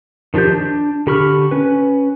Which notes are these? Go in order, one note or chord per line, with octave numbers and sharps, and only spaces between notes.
D#3 F3 D4 G4 G6
D4
D3 G4 B5 C#6 F6
C#4 B4